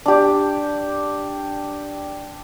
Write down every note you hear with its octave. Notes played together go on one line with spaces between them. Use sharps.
D4 G4